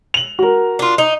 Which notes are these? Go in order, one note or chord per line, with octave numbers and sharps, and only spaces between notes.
F7 F#7
F#4 A#4
D4 F4
D#4